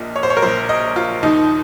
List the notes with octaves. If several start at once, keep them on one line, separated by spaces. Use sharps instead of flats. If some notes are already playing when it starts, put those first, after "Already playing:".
Already playing: A#1 A#2 D#5
C#5
C5
C#5
A#4
A#1 A#2 C5
D#5
F4
D#2 D#3 D#4